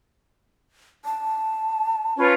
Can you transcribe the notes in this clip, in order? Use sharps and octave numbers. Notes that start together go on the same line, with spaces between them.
A5
C#4 F4 B4